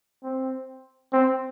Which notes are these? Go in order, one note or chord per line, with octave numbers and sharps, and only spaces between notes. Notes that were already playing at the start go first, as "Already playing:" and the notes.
C4
C4